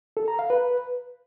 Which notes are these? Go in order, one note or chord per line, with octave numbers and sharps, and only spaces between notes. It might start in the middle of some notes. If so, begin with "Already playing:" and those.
A4
A#5
F5
B4